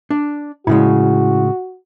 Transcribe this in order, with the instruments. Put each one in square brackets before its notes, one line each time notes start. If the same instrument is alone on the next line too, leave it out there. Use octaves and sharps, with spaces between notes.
[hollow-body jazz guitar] D4
[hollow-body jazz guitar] A2 C#3 G#3 [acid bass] E4 [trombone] F#4